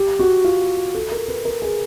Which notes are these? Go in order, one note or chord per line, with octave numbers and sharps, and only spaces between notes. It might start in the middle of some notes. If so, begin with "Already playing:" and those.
Already playing: G4
F#4
F4
A4
A#4
B4
A#4
G#4